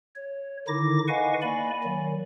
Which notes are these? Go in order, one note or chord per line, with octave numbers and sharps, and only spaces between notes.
C#5
D3 D#3 D#4 E4 D6 A#6
B4 D#5 F5 F#5 G#5 C#6
A#3 D5 G#5 B5
D#3 F#3